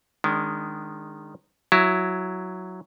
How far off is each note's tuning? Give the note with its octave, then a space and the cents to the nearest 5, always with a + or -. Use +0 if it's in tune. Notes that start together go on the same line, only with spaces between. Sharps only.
D#3 -15 G#3 -5 D4 -35
F#3 +0 E4 +10